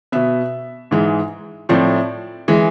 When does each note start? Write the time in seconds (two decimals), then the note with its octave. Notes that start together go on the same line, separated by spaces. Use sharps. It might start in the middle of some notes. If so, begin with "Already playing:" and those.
0.12 B2 B3 E5
0.91 G#2 E3 G#3
1.69 A2 F3 A3 C4 D5
2.48 E3 G#3